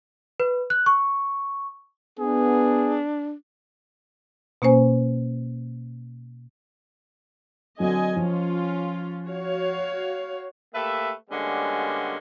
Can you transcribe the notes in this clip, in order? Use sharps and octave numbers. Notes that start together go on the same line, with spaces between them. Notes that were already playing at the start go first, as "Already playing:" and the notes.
B4
F#6
C#6
B3 D4 G#4
B2 A#3 C#4 C5 G#5
D3 F#3 C4 D#5 G#5
F3 C#4 F4
F#4 C#5 F5
A3 A#3 G4 B4 E5
D3 G3 G#3 A#3 B3 C#4